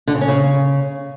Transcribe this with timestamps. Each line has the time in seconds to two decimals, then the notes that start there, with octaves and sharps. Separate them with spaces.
0.07 D3
0.14 C#3
0.21 C#4
0.28 C#3